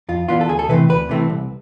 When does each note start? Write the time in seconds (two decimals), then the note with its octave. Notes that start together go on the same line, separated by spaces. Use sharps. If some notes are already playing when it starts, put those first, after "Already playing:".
0.09 F2 F4
0.28 E3 B3 D4 F4
0.41 A4
0.49 D2 G#4
0.59 A4
0.69 C3 E3 A3 C4 B4
0.89 D2 B4
1.09 C3 E3 A3 C4
1.30 C2